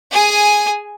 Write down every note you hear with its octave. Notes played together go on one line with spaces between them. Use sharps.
G#4 G#5